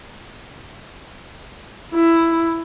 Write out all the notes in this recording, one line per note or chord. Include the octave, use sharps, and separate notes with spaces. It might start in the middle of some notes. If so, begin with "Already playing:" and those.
E4